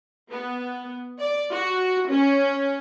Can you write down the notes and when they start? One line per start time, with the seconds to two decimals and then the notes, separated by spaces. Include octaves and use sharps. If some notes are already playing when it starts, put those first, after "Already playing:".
0.31 B3
1.20 D5
1.52 F#4
2.09 C#4